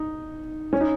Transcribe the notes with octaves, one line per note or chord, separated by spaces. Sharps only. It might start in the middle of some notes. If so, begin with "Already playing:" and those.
Already playing: D#4
C#4
D#4